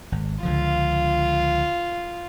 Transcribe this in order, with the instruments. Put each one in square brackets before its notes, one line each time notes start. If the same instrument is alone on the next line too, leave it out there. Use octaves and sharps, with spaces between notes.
[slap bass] G#1
[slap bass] C#2 D3 F3 [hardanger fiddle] F4